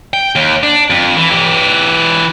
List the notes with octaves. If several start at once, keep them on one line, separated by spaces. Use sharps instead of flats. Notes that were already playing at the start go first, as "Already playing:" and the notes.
G5
D#2
D4
F2
E3
E3 G4